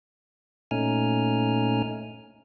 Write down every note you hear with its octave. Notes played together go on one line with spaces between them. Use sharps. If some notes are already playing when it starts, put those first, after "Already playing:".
A#2 A3 C#4 D#4 G#5 F6